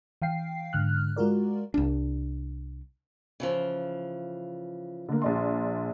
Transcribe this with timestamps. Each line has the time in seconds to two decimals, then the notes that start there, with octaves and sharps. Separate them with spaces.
0.22 E3 F5 G5 C7
0.73 G#2 D3 F6 F#6
1.16 G#3 F4 F#4 A#4 D5
1.74 C2 D4
3.40 C#3 E3 F3
5.09 D3 A#3
5.22 A#1 D5 C6